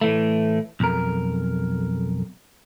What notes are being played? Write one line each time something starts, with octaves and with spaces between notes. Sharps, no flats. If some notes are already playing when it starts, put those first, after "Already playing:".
A2 E3 A3
B1 F2 A#4